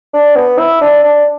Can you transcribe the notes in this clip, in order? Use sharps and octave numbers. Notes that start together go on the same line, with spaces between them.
D4
B3
E4
D4
D4